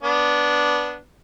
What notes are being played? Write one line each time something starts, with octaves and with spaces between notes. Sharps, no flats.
B3 D4